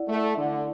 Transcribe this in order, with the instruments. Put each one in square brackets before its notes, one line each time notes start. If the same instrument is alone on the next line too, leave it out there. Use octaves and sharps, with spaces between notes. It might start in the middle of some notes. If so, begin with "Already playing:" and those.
Already playing: [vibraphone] E4 D5 F#5
[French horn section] A3
D3